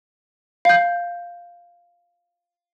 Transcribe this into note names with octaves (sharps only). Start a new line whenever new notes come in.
F5 G6